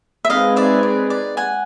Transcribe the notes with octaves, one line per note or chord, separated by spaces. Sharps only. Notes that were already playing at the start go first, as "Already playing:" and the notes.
E5
G#3 C4 D#4 G#4 B4 D#5 F5
D5 E5
D5
D5
F#5 G#5